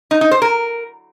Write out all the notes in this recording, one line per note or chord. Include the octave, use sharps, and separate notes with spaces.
D#4
D#4
C5
A#4